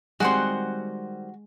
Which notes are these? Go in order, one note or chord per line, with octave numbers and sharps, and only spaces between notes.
D#3 G3 G#3 C4 F#4 F#5 C6